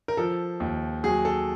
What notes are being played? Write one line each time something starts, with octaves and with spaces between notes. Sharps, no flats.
A#4
F3 A4
D#2
F#3 G#4
A4